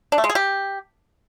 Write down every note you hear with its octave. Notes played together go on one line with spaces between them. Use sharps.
D4
A3
G#3
G#4
G4